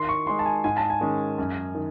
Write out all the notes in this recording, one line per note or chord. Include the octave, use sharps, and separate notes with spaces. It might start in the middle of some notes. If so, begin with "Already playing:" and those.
Already playing: D#3 C6
C#6
G#3 D#4 C6
A5
G#5
G#2 G#5
A5
G#5
D#3 G#3 C#4
F#2
D#3